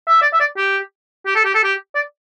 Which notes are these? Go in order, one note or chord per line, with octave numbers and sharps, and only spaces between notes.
E5
D5
E5
D5
G4
G4
A4
G4
A4
G4
D5